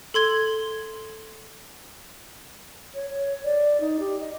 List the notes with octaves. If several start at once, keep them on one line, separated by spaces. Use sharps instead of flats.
A4 C6 G#6 G7
C#5
C#5
D5
D#4
G4
D#5